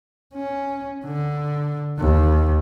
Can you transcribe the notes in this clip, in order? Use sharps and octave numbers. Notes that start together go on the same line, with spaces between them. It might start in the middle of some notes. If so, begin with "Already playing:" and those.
C#4
D3
D#2